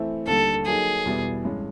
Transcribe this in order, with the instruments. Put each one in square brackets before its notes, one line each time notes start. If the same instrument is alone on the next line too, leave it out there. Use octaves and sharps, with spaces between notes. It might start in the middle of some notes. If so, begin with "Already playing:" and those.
Already playing: [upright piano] E3 A3 C4 E4
[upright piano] D#2 D3 G3 [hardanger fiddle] A4
[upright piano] F#3 A#3 D#4 [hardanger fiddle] G#4
[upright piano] E2 B2 G3 B3 E4
G2 E3 G#3 C#4